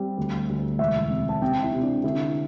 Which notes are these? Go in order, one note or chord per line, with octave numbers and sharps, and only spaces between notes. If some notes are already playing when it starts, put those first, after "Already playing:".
Already playing: G3 C4
D2
D2
E1 E5
C3
A5
C3 G5
E4
C3
D4
D3 E4